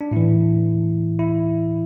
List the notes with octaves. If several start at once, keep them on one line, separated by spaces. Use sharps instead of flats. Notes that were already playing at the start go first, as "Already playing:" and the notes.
D4
A2 E3 E4
E4